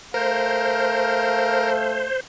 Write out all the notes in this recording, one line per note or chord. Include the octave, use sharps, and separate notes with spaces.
A3 A#4 C5 F5